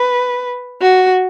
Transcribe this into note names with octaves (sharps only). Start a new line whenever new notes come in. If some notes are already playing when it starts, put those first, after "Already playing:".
Already playing: B4
F#4